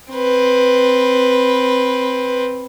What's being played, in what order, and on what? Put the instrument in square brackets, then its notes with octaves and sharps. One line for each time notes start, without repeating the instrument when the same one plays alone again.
[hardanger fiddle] C4 B4